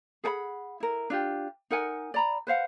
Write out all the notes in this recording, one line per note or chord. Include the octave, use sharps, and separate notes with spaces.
G#4 A4 F#5 B5
E4 A#4
D4 F4 G4
D#4 A#4 F#5 G#5
D5 A#5 B5
B4 C5 F5 F#5